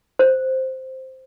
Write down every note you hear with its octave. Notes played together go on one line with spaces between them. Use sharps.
C5